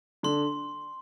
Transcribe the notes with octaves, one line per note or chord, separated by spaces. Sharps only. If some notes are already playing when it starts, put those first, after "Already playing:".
D3 C6